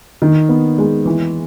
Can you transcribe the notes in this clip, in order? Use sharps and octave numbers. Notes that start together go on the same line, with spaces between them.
D#3
B3
G#3
E3